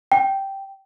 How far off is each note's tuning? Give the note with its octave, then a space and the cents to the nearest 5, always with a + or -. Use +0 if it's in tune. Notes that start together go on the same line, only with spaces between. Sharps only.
G5 -10